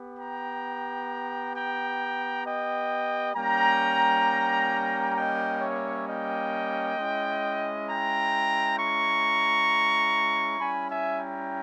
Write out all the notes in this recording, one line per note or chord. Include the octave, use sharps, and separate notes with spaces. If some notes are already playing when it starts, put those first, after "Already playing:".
Already playing: B3 G4
G5 A#5
G5 A#5
D#5 G5
G3 A#3 C#4 G5 A#5
D#5 G5
C#5 E5
D#5 G5
G#3 C#4 E4
G5 A#5
A#5 C#6
G3 C#4 E4 G#5 B5
E5 G#5
G5 A#5